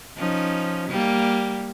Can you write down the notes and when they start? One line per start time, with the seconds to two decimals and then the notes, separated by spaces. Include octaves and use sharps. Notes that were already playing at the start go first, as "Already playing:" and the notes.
0.17 F3 C#4 D#4
0.90 G3 A#3